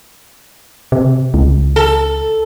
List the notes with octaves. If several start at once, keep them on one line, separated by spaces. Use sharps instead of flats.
C3
C#2
A4